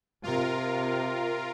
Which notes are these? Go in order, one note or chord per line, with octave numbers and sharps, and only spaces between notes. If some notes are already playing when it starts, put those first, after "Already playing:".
C3 F4 A#4